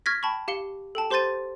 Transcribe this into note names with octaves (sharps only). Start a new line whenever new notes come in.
C#6 F6 G#6 A#6 B6
G5 A5 B5 C#6
G4 F5 C#7 G7
A4 G5 A5
G4 C5 C6 G6 A6 D#7